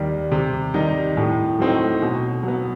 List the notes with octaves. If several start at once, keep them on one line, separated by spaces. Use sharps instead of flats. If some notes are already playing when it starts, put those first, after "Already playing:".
Already playing: D#2 D#3 G3
C3
D#3 G3 D#4
A2
F#3 A3 C4 D#4
B2
F#3 B3